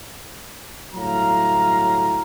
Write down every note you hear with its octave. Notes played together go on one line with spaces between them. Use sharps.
G1 A2 F#3 F5 A#5